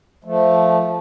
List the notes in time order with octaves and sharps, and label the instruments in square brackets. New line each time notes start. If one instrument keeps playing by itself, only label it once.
[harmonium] F3 A3